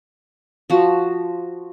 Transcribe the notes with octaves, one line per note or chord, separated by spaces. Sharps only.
F3 F#4